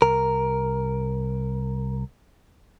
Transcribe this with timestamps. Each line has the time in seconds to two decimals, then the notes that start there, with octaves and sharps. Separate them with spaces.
0.02 C2 A#4